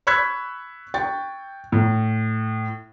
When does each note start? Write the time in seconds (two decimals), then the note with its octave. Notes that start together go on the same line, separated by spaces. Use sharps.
0.07 B5 C#6 E6 F#6 G#6 B6
0.94 G5 C#6 A6
1.72 A2